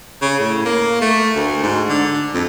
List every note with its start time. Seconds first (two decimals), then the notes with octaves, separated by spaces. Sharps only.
0.22 C#3
0.40 A2
0.66 A#3
1.02 A3
1.36 D2
1.63 G#2
1.89 D3
2.34 F2